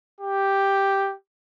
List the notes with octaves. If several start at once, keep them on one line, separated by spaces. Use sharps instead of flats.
G4